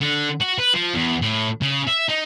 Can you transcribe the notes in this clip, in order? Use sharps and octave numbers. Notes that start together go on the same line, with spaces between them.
D3
F#4
B4
F3
E2
A2
C#3
E5
D#4